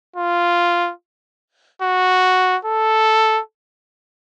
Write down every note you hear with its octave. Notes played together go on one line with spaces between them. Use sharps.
F4
F#4
A4